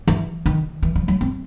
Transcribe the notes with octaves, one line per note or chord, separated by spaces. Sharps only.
E3
D#3
E3
F3
F#3
C4